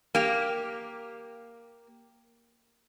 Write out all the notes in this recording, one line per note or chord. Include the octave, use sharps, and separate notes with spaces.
A#3 G4